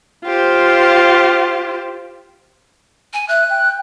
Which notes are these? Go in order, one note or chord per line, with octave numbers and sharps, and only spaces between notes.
F4 G4 C5
G#5
E5 F#6
G5